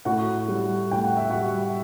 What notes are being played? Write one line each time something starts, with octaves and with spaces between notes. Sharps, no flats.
A2 F#4 F#5
G3
A2 G5
F#5
E5
G3 F#4 F#5